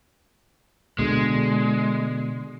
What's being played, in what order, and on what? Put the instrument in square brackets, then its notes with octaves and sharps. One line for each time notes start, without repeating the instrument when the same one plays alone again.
[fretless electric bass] B2 D3 [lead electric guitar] G#3